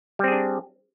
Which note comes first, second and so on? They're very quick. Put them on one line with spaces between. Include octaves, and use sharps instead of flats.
G3 C4 G#4 D4